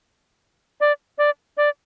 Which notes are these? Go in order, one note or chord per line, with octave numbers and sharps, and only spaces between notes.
D5
D5
D5